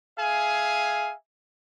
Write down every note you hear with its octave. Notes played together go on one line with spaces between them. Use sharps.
G#4 E5 F5 G#5